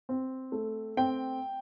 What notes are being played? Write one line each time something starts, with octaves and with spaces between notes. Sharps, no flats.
C4
A3
C4 G5